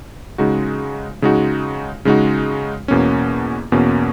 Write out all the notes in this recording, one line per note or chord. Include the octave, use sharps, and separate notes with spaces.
C#3 G#3 D#4 F#4
C#3 G#3 D#4 F#4
C#3 G#3 D#4 F#4
E2 B2 A#3 C#4
E2 B2 A#3 C#4